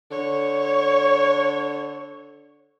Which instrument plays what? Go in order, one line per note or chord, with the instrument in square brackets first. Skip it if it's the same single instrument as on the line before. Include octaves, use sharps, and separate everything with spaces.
[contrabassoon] D3 [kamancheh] C#5